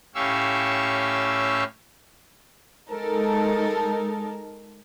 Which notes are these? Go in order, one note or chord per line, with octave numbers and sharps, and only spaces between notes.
A2 C#4 G4 F5 C#6 E6
G#3 D#4 A4 A#4